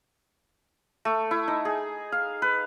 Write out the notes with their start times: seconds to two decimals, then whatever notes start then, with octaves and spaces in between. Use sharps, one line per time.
1.05 A3
1.31 E4
1.48 D#4
1.65 G#4
2.12 F5
2.42 B4